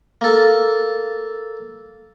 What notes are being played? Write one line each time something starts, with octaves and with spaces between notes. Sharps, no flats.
A#3 A4